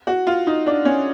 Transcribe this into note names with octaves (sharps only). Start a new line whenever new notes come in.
F#4
F4
D#4
D4
C#4